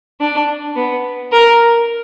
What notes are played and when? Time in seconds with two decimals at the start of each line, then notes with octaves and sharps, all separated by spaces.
0.20 D4
0.76 B3
1.32 A#4